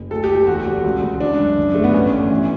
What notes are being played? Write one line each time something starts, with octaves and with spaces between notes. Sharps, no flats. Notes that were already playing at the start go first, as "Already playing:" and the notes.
Already playing: F#1
D2 A4
G4
D2
G4
E2 F#4
E1
C#2
C#2
C#3 D4
F#2
F#2
G1 A3
B3
A1 C#4
A1
E3